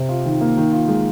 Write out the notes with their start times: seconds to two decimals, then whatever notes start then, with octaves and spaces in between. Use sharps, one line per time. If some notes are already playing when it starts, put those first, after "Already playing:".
Already playing: C3
0.09 F4
0.26 D#3
0.41 A#3
0.57 D#3
0.72 F4
0.88 G#3